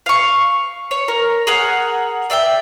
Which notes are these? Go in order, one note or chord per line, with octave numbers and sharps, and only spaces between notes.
F5 C#6
C#5
A#4
G#4 A#4 F#5
D5 E5 F5 G5